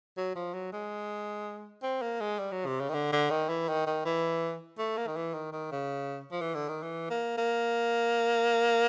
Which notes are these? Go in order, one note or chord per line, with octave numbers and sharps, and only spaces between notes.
F#3
F3
F#3
G#3
C4
A#3
G#3
G3
F#3
C3
C#3
D#3
D3
D3
D#3
E3
D#3
D#3
E3
A3
A#3
D#3
E3
D#3
D#3
C#3
F3
E3
D3
D#3
E3
A#3
A#3